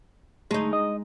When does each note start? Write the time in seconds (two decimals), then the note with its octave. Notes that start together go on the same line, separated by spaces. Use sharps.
0.51 D2 G#3 A3 D#4
0.73 D#5